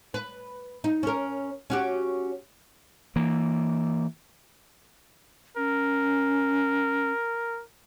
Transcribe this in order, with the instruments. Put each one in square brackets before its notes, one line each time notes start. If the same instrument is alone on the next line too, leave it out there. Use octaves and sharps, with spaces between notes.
[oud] B4
D#4
C#4 A#4
C#4 F#4 G4
[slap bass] E3 A#3
[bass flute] C#4 [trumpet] A#4